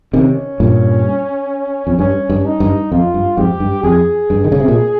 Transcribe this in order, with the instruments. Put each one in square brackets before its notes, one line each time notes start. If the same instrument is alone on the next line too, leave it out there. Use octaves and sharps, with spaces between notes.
[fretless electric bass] C3 D#3 [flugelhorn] C#4
[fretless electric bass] G2 A#2
F2
[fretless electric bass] G2 [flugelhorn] C#4
[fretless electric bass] G2
[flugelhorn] D#4
[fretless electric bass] G2
[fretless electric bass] F2 [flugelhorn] F4
[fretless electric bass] G2
[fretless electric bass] F2 G#2 [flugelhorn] G4
[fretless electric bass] G2
[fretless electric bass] F2 [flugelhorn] G#4
[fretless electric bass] G2
D#3
C#3
C3
A#2